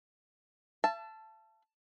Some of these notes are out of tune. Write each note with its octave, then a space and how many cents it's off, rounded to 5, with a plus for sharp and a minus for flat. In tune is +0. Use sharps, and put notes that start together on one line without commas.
E5 +45 A5 +0